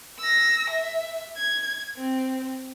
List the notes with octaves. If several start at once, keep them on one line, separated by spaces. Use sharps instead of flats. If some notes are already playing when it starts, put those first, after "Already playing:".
E6 A#6
E5
G#6
C4